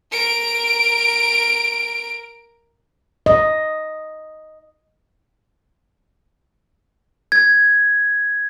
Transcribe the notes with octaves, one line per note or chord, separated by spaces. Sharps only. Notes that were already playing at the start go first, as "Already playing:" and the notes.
A#4 D7
D#5
G#6